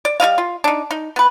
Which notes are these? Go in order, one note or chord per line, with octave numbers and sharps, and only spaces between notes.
D5
G3 F4 D#5 F5
F4
D4 D#4
D#4
B3 B4